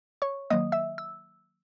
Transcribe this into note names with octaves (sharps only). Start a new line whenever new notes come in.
C#5 C#6
D#3 F#3 A#3 D#5 D#6
E5 E6
E6